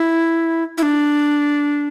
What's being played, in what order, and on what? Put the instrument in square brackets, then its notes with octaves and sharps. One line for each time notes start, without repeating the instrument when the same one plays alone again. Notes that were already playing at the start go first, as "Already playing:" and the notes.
Already playing: [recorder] E4
E4
D4